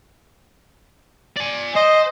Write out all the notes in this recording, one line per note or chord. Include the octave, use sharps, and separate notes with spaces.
D5 G#5
C5 D#5